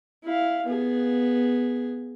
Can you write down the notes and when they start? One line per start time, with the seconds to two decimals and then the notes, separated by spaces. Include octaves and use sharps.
0.24 E4 F5
0.66 B3 G#4